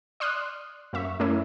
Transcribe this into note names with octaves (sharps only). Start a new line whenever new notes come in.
D5 C6 D#6 F6 F#6
F#2 A#3 E5 C#6
F#2 A3 A#3 C#4 E4